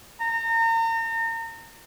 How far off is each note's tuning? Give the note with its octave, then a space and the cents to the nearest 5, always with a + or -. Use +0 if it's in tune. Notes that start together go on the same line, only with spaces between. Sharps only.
A#5 -35